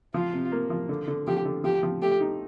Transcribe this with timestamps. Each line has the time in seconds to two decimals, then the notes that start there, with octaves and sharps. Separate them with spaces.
0.14 F3 F4
0.33 C3
0.52 A#3
0.70 F3
0.89 D3
1.08 D3
1.27 F3 G4
1.45 D3
1.64 F3 G4
1.83 F3
2.02 A3 G4
2.21 D#4